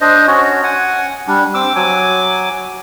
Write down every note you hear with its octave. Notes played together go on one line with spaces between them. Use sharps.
D4 C5 D#5
C#4 F#4 C#5
F#5 G#5
G3 D4
C4 D6 E6
F#3 G#5 D6